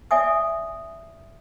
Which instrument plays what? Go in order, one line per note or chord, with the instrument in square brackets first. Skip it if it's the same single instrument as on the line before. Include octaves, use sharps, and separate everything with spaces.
[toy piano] D5 E5 G#5 D#6